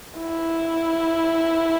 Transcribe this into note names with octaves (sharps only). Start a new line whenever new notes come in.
E4